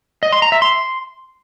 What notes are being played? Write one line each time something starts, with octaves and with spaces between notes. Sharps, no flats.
D#5
C6
A#5
E5
C6